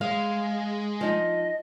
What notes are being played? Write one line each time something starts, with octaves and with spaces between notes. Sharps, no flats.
G#3 F5
F3 D#4 D#5